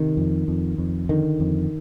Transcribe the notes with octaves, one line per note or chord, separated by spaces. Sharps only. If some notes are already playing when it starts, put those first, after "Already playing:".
Already playing: C3 D#3
F2
F2
F2
D3 D#3
F2